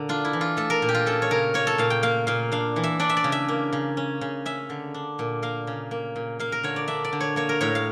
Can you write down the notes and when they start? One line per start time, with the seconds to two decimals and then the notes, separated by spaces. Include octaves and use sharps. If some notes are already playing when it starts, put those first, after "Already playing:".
Already playing: A#2 D3 A#3
0.09 D4 F4
0.25 E4
0.33 E3
0.41 F4
0.57 A3 A4
0.70 A#4
0.82 A#2
0.89 G4
0.94 F4
1.06 C#4 A4
1.22 C#5
1.31 C#3 A#4
1.54 A#3 C#5
1.67 A4
1.78 A#2 F5
1.90 G5
2.03 A#3 F5
2.27 A#2 F5
2.52 D4 F5
2.76 E3
2.84 E5
2.99 D4 D5
3.09 E5
3.17 D5
3.24 C#3
3.32 E5
3.48 A#3
3.72 C#3
3.97 C#4
4.21 C#3
4.45 C#4 E5
4.70 D3
4.94 D4
5.19 A#2
5.42 A#3 F5
5.67 C#3
5.91 A#3
6.16 A#2
6.39 A#3 F5
6.52 A#4
6.63 D3 C#5
6.76 D5
6.88 D4 E5
7.04 D5
7.13 D3
7.20 C#5
7.36 A#3 C#5
7.49 A#4
7.61 A2 C#5
7.75 F5